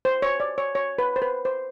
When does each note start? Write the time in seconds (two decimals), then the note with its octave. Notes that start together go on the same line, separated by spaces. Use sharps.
0.05 C5
0.22 C#5
0.40 D5
0.58 C#5
0.75 C#5
0.98 B4
1.16 C5
1.22 B4
1.45 C5